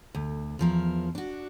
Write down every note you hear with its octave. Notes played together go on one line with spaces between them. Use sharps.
D2
E2 F3 A#4
D4 F#4